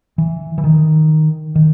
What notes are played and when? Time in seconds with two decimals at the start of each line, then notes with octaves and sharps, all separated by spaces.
0.18 E3
0.58 E3
0.64 D#3
1.55 D#3